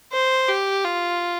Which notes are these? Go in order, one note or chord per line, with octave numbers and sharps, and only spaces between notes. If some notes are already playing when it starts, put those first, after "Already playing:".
C5
G4
F4